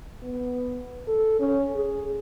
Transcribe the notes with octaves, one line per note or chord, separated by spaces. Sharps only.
B3
A4
C#4
G#4